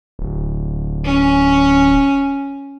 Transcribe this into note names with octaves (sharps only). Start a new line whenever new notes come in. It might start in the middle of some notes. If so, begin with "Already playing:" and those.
D1
C#4